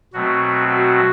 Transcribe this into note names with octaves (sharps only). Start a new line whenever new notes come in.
B2 F#3 A3 C4 F#4
F#4